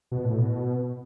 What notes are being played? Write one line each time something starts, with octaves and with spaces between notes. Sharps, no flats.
B2
A2
B2